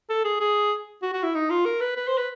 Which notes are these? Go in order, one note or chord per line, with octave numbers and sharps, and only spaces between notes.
A4
G#4
G#4
F#4
F#4
E4
D#4
F4
A#4
B4
B4
C5
B4